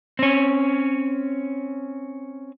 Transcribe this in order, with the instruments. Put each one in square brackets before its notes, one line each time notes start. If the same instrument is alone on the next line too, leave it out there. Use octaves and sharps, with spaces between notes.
[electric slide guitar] C4 C#4